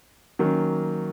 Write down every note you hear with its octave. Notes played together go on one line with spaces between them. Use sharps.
D#3 F#3 A#3 C#4